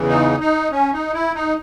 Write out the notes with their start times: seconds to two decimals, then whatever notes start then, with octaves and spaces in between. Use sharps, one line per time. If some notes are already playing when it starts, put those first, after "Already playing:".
Already playing: E2 C#3 E3
0.09 D#4
0.40 D#4
0.72 C#4
0.93 D#4
1.13 E4
1.35 D#4